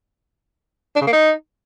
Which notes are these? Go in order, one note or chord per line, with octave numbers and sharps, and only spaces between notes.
D4
C#3
A#3
D#4